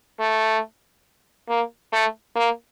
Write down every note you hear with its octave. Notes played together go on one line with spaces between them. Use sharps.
A3
A#3
A3
A#3